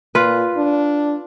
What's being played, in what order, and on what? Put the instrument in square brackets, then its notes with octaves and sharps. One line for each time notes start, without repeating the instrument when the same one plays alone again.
[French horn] A#2 [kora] F4 B4
[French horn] D4